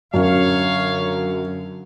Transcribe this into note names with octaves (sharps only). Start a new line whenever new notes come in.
F#2 D3 F#3 C#5 F5